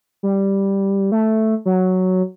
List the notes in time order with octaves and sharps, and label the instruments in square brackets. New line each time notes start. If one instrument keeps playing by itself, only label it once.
[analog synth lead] G3
A3
F#3